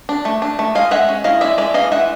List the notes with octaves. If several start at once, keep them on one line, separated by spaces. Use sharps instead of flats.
D4
A3
D4
A3
G#3 D#5 F5
G#3 E5 F#5
C#4
E4 D#5 F5
G#3 D5 E5
G#3 D5 E5
E3 D#5 F5
E3 E5 F#5